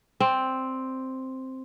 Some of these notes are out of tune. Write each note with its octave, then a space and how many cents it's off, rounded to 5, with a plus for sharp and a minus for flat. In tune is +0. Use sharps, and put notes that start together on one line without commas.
C4 +0 D5 +0